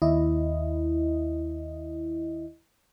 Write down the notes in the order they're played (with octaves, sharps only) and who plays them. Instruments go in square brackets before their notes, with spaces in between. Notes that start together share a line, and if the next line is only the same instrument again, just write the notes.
[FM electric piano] D#2 E4 D#5